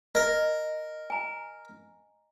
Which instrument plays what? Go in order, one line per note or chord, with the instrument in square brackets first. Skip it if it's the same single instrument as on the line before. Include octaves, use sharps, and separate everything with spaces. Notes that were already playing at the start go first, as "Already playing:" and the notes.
[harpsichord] A#4 [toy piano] D#5
[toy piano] G#5 A#5